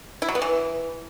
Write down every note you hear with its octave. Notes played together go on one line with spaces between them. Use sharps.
E4
F#3
B3
E3